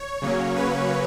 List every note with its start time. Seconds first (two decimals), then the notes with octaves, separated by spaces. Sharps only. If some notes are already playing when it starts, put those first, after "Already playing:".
Already playing: C#5
0.22 C#3 F#3 A#3 C#4
0.56 B4